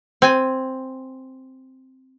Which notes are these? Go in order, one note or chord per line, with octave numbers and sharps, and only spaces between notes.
C4 G#5